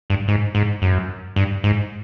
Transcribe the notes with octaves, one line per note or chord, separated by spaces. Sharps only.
G2
G#2
G#2
F#2
G2
G#2